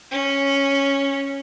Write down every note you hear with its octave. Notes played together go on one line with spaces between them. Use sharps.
C#4